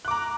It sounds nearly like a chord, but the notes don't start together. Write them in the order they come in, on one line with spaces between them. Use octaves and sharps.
F#6 D6 A#5